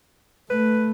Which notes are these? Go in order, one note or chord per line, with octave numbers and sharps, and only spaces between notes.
A3 B4